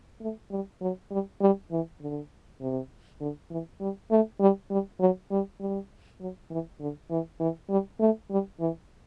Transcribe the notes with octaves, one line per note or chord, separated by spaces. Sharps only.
A3
G3
F#3
G3
G3
E3
D3
C3
D3
E3
G3
A3
G3
G3
F#3
G3
G3
F#3
E3
D3
E3
E3
G3
A3
G3
E3